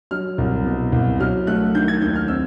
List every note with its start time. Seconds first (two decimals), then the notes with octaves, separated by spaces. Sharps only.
0.11 F#3 F6
0.38 C2
0.66 B2
0.92 C2
1.20 F#3 F6
1.47 A3 F#6
1.75 D#3 G6
1.88 G#6
2.02 D#2 G6
2.16 F6
2.28 C4 E6